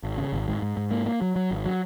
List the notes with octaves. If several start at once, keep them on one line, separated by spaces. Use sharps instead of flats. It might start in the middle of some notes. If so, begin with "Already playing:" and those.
G#1
C#3
G#1
G#2
G#2
G#2
A#3
A#3
F#3
F#3
G#1
F#3